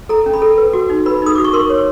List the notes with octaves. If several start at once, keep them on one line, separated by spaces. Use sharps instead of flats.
A4 A#5
C#4
B5
A4
B4
F#4
D#4
B4 B5
D#4 D#6
F#4 D6
C#6
A#4 C6
C#5